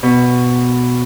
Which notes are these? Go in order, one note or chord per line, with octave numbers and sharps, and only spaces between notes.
B2